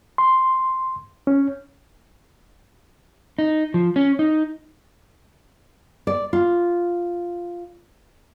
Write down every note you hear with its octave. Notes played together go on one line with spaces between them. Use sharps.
C6
C#4
D#4
F3
C#4
D#4
D5
F4